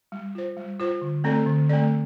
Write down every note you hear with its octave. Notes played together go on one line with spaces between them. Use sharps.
G3
F4 C5
G3
F4 C5
D3
A3 C4 A4 D5
D3
A3 C4 A4 D5